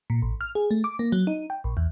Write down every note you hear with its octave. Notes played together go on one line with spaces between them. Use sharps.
A#2
A1
F6
G#4
A3
D6
A#3
F#3
D#4
G5
A#1
E2